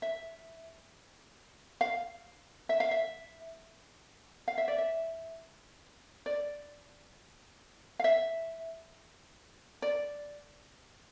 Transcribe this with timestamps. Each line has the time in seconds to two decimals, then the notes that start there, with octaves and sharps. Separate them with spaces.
0.02 E5
1.81 F5
2.69 E5
2.80 F5
2.91 E5
4.48 F5
4.58 E5
4.68 D5
4.78 E5
6.26 D5
7.99 F5
8.04 E5
9.82 D5